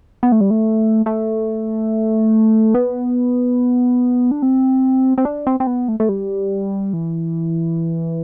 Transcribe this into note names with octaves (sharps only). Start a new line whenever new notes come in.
B3
A3
G3
A3
A3
B3
D4
C4
C4
D4
C4
C4
B3
A3
A3
G3
E3